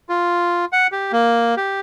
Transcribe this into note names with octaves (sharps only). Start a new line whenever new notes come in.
F4
F#5
G4
A#3
G4